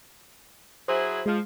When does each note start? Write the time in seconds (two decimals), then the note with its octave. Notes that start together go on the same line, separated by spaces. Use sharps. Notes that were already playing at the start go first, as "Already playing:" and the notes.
0.88 F#3 E4 G#4 C5
1.26 F3 G#3